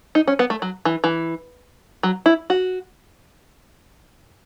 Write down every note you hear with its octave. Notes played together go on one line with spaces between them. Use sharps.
D#4
C#4
B3
A3
F#3
E3
E3
F#3
E4
F#4